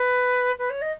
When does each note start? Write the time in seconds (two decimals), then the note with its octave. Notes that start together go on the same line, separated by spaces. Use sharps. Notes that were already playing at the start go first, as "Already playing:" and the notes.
Already playing: B4
0.58 B4
0.69 C#5
0.81 D#5